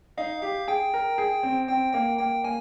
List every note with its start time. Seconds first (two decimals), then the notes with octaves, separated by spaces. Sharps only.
0.17 D#4 F5
0.42 G4 F5
0.68 G#4 G5
0.94 A#4
1.18 G#4
1.43 C4
1.68 C4 G5
1.93 A#3 G5
2.18 A#3 G5
2.44 A#3 G#5